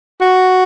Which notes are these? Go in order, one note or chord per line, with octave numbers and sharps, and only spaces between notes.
F#4